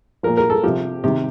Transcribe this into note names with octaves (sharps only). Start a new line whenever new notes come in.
A#2 F3 A#4
A#4
A4
C3 F3 G4
C3 D#3 G4